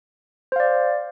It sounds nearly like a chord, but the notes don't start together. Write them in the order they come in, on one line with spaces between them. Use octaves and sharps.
C5 F5 D5